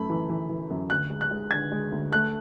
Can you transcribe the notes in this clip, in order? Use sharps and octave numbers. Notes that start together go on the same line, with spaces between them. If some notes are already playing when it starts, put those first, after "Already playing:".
Already playing: F#2 A3 B5
E3
E3
E3
F#2
D2 F#6
G#3
F#6
G#3
D3 G#6
G#3
D2
A3 F#6